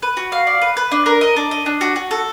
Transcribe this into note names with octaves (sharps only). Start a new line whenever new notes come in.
B4
F#4
F5
D5
B4
B4
D4
A#4
D#5
D4
D#5
D4
F#4
F#4
A4